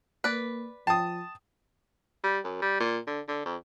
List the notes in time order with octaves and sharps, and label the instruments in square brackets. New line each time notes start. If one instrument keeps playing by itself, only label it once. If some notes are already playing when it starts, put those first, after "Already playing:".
[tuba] A#3 [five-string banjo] B4 D5
[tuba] F3 [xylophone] G5 [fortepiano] A5 D#6
[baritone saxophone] G3
F#2
G3
A#2
D3
D3
F2